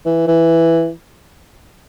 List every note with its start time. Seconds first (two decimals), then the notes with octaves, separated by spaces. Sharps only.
0.06 E3
0.27 E3